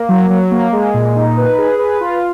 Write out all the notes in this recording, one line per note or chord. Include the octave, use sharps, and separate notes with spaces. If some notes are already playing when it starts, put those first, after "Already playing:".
Already playing: A#3
F#3
F#3
A#3
G#3
A#2
D#4
B4
G#4
B4
F4